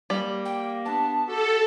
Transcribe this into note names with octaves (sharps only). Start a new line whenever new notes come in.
G3 A#3
G5
B3 D4 A5
F#4 G4 A4